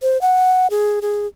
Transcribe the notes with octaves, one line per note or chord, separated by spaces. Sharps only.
C5
F#5
G#4
G#4